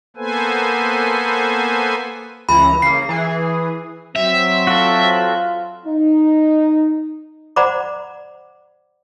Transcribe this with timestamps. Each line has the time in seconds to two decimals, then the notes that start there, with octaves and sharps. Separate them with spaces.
0.16 A#3 B3 A4 B4 C5 G#5
2.49 C#2 E3 A#5 B5
2.82 C#3 A#3 C7
3.09 E3 G#4
4.16 F#3 C4 E5
4.67 F4 F#4 A4
5.86 D#4
7.56 C5 D5 F#5 A#5 B5 D6